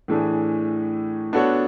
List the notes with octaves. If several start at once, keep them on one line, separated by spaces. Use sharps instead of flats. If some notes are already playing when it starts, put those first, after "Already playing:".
A2 E3 A3 D4 G#4
B3 D4 F#4 A4 C#5